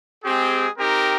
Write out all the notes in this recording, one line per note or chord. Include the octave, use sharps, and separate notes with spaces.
G#3 C4 G4 G#4
C4 D#4 G4 A#4